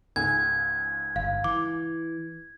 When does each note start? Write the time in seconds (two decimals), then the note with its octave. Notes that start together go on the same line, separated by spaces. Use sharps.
0.16 C#2 G#2 G#5 G#6
1.16 G1 F5
1.44 E3 D6